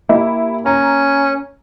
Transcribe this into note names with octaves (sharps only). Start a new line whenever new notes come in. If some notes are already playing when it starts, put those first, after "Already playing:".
A#3 E4 G4
C#4 A#5